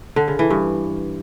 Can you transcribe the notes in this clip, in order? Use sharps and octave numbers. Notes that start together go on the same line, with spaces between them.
D3
C#3
E3
G2